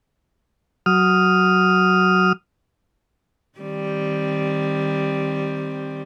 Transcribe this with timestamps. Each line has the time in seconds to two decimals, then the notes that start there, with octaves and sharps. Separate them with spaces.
0.86 F#3 D#6 F6
3.59 D#3 G3 C4